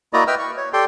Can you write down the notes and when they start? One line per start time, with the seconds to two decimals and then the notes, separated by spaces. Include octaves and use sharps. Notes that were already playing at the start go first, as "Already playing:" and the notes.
0.13 A#3 E4 F#4 D5 D#5 A#5
0.27 B4 D#5 E5 G5 E6 F6
0.39 C#6
0.57 C#5
0.73 G4 A4 D5 G5 C6